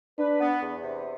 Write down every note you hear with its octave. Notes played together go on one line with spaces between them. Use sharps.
D4 B4
B3
E2
C3